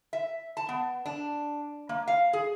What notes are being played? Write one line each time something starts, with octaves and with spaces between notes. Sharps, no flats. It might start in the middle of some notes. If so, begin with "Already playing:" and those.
E5
A5
B3
D4
A#3
F5
G#4